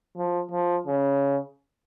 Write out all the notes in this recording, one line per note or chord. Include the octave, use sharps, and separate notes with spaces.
F3
F3
C#3